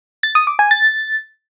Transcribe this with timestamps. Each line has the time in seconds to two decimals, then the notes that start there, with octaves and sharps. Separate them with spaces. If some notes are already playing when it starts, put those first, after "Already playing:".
0.23 A6
0.35 D#6
0.47 D6
0.59 G#5
0.71 A6